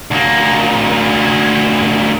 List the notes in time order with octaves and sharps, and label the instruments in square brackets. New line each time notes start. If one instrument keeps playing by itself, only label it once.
[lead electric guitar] D2 A#3